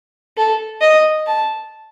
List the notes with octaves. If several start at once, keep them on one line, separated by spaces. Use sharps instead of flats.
A4
D#5
A5